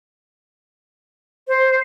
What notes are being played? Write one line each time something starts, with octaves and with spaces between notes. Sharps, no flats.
C5